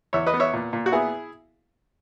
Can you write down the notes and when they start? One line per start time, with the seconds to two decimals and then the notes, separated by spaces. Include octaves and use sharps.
0.13 E2 C#5 E5
0.27 B4 D#5
0.34 B3
0.40 C#5 E5
0.54 A#2
0.73 A#2
0.86 F#4
0.92 B3 E4 G#4